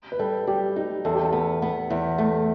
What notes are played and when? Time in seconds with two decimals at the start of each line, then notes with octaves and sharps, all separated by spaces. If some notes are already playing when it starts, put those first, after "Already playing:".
0.12 B4
0.19 G3 A4
0.47 G3 G4
0.76 D#4 G4
1.05 E2 A4
1.15 G4
1.25 A4
1.33 B3
1.62 B3 B4
1.90 E2
2.18 A3